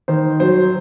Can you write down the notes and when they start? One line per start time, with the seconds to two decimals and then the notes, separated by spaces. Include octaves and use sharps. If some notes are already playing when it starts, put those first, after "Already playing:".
0.08 D#3 C5
0.40 F#3 C5